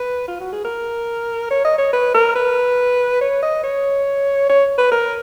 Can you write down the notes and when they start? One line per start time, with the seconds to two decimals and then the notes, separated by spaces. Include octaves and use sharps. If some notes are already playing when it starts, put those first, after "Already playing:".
Already playing: B4
0.28 F4
0.40 F#4
0.52 G#4
0.65 A#4
1.50 C#5
1.64 D#5
1.78 C#5
1.93 B4
2.14 A#4
2.35 B4
3.21 C#5
3.42 D#5
3.63 C#5
4.49 C#5
4.78 B4
4.91 A#4